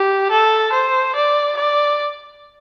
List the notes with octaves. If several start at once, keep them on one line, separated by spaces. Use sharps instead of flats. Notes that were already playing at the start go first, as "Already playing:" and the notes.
Already playing: G4
A4
C5
D5
D5